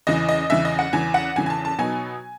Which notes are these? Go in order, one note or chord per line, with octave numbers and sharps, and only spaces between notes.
E2 C#3 E3 D#5
D#5
E2 C#3 E3 E5
D#5
F#5
E2 C#3 E3 G#5
F#5
E2 C#3 E3 G#5
G#5
A5
A5
B2 F#3 B3 D#4 G#5